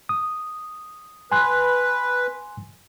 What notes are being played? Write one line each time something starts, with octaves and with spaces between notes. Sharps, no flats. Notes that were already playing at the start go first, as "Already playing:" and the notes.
D#6
B4 G#5 C6 F#6